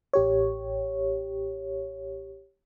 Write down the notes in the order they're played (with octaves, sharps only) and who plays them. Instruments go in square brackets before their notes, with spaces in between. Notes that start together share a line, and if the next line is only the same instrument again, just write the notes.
[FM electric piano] A1 G4 C#5